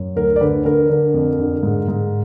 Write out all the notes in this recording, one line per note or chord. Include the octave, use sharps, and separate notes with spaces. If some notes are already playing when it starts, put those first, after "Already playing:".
Already playing: F#2
D2 A#4
D5
D3 B4
D3 A#4
D3
F2
D3
G#2
G#2